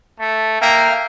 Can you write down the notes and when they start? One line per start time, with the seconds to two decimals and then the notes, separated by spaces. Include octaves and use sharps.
0.19 A3
0.62 A#3 E5 G5 F6